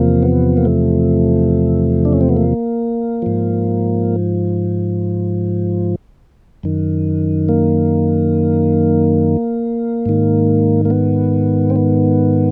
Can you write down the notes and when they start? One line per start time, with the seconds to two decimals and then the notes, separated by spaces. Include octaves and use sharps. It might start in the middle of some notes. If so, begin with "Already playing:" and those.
Already playing: E2 C3 F3 A#3
0.23 B3
0.57 A#3
0.65 A3
2.05 D4
2.13 C#4
2.21 C4
2.29 B3
2.37 A#3
3.22 G#2 F3
6.63 F#2 D#3
7.49 A#3
10.06 G#2 D#3
10.85 A#3
10.90 B3
11.70 C4
11.76 B3